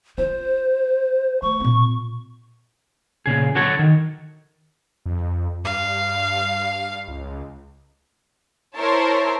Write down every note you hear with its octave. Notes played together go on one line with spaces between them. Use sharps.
F4 C5
A3 C#6
A#2 C4
A#2 C#3 G#4
D3 F#3 F#4 A4 C#5
D#3
F2
G2 F5
C#2
E4 A#4 C5 C#5 A5